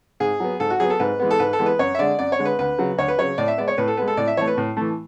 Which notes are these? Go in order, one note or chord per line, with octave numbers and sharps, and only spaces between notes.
G#2 G#4
F#3 B3
G#2 A4
F#4
F#3 B3 G#4
A4
G#2 B4
E3 G#3 B3
A4
G#2 B4
A4
E3 G#3 B3
B4
F#2 C#5
E5
D3 G#3 D5
F#2 D5
C#5
D3 G#3
B4
D2 B4
C#3 F#3
D2 C#5
B4
C#3 F#3 C#5
A2 D5
E5
G#3 B3 D5
C#5
A2 B4
A4
G#3 B3 B4
A4
A2 D5
E5
E3 A3 C#5
B4
A2
E3 A3